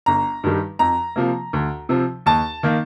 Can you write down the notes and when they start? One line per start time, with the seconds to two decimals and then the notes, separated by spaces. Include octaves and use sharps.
0.06 G1 A#5
0.44 G2 D#3 G3
0.79 F2 A#5
1.16 C3 F3 A#3
1.53 D2
1.89 C3 F3 C4
2.26 D#2 A5
2.63 D#3 A#3